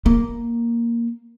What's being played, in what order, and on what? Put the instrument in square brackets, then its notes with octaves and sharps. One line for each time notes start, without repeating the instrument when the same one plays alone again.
[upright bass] A#3